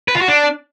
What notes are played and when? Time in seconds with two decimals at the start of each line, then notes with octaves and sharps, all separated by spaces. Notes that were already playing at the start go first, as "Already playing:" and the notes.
0.08 B4
0.15 F4
0.21 F#4
0.28 D4